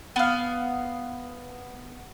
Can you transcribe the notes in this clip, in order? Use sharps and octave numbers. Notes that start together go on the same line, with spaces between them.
B3 F5